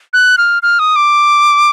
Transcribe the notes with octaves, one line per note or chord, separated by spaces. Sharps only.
F#6
F6
F6
D#6
D6